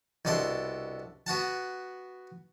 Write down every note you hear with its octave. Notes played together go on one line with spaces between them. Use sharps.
C2 B2 D4 A4 C6 D6
B3 F#4 F#5 A5